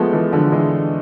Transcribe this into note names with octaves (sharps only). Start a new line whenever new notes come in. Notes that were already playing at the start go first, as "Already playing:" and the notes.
Already playing: F3 G#3 A3 B3
E3 G#3
D3 F3
E3 G#3